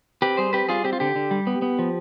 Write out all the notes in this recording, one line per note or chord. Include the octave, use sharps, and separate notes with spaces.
C4 G4 B4
G3 G#4 C5
C4 G4 B4
G3 F4 G#4
C4 G4
F4
D3 G4
D3
G3
B3
B3
F3